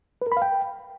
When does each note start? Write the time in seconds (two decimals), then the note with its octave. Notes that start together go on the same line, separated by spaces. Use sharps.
0.22 B4
0.27 A#4
0.32 B5
0.37 F5
0.42 G5